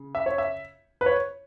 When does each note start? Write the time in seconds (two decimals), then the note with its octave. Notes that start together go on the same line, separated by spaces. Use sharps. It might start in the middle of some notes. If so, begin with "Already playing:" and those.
Already playing: C#3
0.15 E5
0.26 C#5
0.38 E5
1.01 B4
1.06 C#5